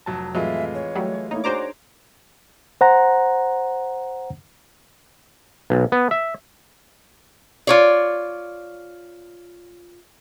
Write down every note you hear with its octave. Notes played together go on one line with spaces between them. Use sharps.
F1 F#3 A5
F1 A2 E3 F#3 G#3 F4 A4 E5
C#5
F#3 G3 A3
A3 A#3 D#4 E4 C#5
D4 D#4 F#4 G#4 C5 D5 A#5 D6
C5 F#5 A#5
B1
B3
E5
F4 C#5 D5